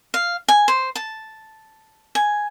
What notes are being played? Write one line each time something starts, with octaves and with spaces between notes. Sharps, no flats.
F5
G#5
C5
A5
G#5